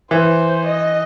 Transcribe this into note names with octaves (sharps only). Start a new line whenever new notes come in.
E3 C5
D#5